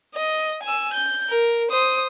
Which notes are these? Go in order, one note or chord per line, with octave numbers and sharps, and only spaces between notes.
D#5
G#5 E6
G6
A#4
C5 D#6